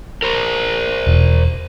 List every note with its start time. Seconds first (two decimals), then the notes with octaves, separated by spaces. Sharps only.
0.23 A#4 C5
1.07 E1